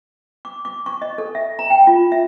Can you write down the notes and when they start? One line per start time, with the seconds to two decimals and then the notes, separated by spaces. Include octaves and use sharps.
0.45 D6
0.65 D6
0.86 C#6
1.02 D#5
1.18 A4
1.35 E5
1.59 A#5
1.70 G5
1.87 F4
2.12 E5